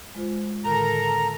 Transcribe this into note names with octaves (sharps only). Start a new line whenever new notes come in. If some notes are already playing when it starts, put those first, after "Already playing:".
G#3 F4 C5
A2 D3 D#3 A4 A#4 A#5